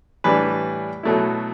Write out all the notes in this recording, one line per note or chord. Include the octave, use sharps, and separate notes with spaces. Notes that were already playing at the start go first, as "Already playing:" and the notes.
A2 E3 G3 D4 B4
B2 F#3 A3 E4